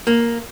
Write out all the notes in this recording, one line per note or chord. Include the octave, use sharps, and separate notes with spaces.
A#3